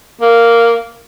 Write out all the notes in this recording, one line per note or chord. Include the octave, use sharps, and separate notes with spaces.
A#3